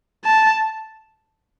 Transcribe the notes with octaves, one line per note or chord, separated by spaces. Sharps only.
A5